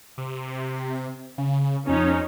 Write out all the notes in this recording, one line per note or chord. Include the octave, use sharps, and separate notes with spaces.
C3
C#3
F2 C#4 D#4